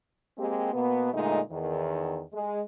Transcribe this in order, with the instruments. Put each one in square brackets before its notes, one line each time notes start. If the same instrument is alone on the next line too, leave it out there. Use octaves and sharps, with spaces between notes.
[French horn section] G#3 A#3 C4 G4
B2 A#3 B3
A#2 D3 G#3 A3 D#4
E2 D#3
G#3